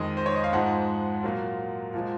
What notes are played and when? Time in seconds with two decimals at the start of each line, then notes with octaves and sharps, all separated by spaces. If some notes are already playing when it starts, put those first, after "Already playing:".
Already playing: F2 D#3 G#3 D#5
0.17 C5
0.26 C#5
0.36 D#5
0.44 F5
0.53 G#2 F3 G#3 F#5
1.23 A#2 F#3 A#3
1.94 A#2 F3 G#3